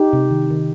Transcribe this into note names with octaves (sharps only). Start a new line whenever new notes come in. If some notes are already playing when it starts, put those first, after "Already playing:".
Already playing: D#4 G4
C3
D#3
D#3